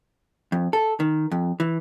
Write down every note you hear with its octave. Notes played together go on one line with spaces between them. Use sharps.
F2
A4
D#3
F2
E3